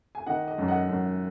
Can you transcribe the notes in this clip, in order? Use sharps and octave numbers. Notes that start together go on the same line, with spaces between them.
G#5
D#3 D#5 F#5
D#5
F#2
D#5 F#5
F#2